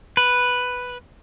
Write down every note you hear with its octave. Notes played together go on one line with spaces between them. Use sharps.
B4